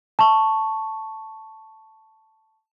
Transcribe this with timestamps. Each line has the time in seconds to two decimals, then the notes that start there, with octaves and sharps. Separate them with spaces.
0.19 A5 C#6